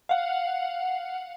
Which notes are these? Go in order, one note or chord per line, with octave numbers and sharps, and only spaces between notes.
F5 F#5